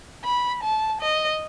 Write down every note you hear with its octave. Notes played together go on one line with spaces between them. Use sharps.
B5
A5
D#5